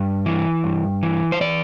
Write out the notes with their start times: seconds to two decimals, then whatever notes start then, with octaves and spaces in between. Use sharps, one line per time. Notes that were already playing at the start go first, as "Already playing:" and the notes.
Already playing: G2
0.26 E3
0.64 G2
1.03 E3
1.32 C5
1.41 E3 D5